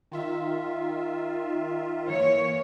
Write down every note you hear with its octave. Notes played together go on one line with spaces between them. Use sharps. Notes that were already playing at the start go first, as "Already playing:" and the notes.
D#3 F4 E5
E3 A#3 C#5